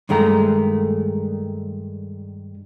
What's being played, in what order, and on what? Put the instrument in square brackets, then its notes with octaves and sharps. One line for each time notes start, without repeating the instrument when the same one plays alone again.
[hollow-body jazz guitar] G2 D#3 G#3 A3 A#5